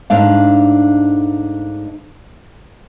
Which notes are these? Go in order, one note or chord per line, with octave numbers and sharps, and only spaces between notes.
G#2 A3 D4 F5